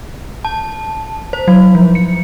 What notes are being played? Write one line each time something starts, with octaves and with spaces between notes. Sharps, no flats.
A5
C5
F#3
F3
C#7